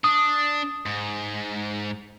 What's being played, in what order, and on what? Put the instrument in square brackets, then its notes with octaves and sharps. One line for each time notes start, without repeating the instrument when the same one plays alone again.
[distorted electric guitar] D4 [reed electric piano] D#6
[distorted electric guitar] G#2